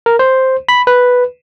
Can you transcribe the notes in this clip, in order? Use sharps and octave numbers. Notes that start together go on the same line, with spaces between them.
A#4
C5
B5
B4